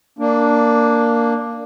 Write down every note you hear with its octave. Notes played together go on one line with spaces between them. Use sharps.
A#3 D4